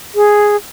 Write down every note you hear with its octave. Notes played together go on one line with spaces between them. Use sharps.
G#4